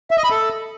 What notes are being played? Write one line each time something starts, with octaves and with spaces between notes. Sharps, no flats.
E5
D#5
B5
A4